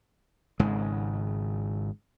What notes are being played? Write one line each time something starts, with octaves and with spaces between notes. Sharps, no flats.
G#1 G#2 C#3 G#3